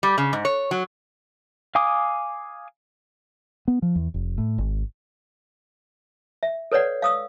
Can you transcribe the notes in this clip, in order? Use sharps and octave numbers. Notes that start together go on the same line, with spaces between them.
G3
C#3
G#2
C#5
F#3
F5 G#5 D6 D#6
B3
F3
E2
F1
A2
G#1
E5
A4 B4 C#5 D5 F#5
F5 D#6 E6